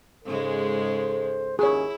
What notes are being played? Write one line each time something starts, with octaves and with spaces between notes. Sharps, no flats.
G#2 C#3 G#3 A4 C5
D#2 C#4 E4 G#4 C#5